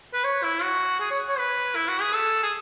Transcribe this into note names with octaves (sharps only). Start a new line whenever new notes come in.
B4
C#5
E4
F#4
G#4
C#5
C#5
B4
E4
F#4
G#4
A4
G#4